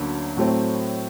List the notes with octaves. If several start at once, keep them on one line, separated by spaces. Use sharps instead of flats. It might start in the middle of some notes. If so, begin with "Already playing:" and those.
Already playing: D2 D3 F#3 A#3 C#4
A2 F#3 A3 C4